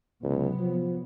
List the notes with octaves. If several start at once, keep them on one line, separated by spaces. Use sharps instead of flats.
C#2 C3 F#3 B3
F3